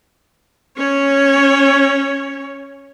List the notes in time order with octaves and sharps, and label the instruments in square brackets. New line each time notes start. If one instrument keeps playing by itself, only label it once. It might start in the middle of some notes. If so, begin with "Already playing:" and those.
[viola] C#4 C#5